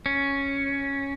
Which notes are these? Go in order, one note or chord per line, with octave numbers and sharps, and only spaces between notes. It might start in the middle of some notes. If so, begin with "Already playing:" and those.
C#4